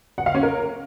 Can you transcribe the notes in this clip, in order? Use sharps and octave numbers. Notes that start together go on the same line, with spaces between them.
F#5
F5
C#4
A#4